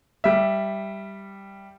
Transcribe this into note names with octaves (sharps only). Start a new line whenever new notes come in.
G3 E5